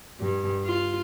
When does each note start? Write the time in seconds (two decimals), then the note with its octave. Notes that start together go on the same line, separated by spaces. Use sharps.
0.20 G2
0.65 F4